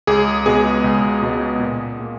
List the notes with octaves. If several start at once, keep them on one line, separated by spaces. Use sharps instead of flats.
C#2 G#4
B2 G#3 B3 G#4
C#2
B2 G#3 B3
A#2
A#3